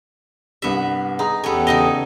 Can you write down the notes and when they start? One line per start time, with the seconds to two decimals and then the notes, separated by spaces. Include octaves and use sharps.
0.62 C2 G2 G3 B3 E5
1.19 D#4 G#4 A#5
1.44 E2 B3 C#4 G4 A4
1.67 C#3 D#4 D#5 G7